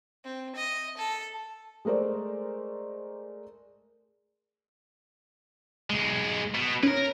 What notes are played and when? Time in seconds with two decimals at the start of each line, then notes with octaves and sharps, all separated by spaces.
0.24 C4
0.56 D#5
0.97 A4
1.85 G#3 A3 A#4 C5 D5
5.90 B1 G#3
6.55 B2
6.83 C#4 A#4 B4